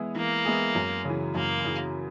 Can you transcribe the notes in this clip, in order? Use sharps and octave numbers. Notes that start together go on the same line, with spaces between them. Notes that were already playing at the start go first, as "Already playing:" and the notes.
Already playing: E3 G#3 B3 E4 G#4
E3 A#3
G#3 B3 E4 G#4
F#2
C#3 E3
F#2 A#3
C#3 E3